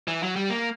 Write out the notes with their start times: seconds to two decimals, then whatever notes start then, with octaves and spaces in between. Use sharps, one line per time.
0.08 E3
0.23 F#3
0.36 G3
0.50 A#3